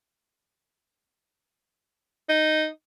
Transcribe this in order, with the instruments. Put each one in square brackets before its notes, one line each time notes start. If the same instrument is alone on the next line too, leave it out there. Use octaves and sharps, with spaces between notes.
[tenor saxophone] D#4